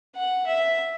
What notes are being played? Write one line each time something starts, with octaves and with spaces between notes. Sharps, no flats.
F#5
E5